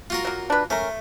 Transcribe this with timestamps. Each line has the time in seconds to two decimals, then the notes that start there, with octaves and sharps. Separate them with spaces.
0.10 F4 F#4 A#4
0.25 F#3 A#3
0.50 D4 B4
0.70 A3 C#4 A#4